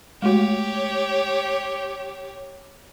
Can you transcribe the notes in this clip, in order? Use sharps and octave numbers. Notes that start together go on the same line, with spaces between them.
G#3 A3 F#4 G4 C#5